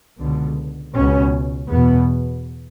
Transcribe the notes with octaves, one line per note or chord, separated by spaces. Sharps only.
C#2 B2 D3
C#2 B2 C#4
E2 B2 B3